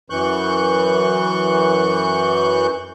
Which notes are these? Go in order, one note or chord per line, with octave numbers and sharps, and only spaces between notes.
F#2 E3 C#6 F#6 G6